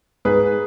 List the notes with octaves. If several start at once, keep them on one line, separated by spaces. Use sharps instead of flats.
G#2 G#4 B4